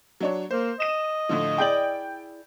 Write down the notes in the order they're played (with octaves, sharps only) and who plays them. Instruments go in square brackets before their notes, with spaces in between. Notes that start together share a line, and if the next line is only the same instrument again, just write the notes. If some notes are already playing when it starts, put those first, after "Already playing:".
[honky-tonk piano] F#3 D4 C#5
[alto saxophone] A#3 [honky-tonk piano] C5
[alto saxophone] D#5 [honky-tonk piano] D#7 E7
[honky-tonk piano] A2 D3 F3
[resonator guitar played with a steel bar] E4 G#4 D5 [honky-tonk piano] G5 G6 F#7